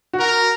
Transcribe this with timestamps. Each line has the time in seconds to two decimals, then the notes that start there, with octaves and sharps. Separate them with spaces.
0.13 F#4
0.20 A#4